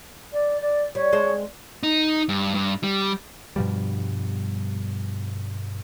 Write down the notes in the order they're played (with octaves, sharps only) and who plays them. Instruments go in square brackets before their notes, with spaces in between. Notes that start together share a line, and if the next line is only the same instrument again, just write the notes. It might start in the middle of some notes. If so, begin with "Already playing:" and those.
[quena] D5
D5
[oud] G3 [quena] C#5
[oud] G#3 C4
[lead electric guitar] D#4
G2
G2
G3
[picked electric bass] G2 B2 F3 G3